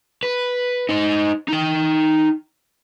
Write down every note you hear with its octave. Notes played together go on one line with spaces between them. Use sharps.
B4
D#4 C5
D#4 G5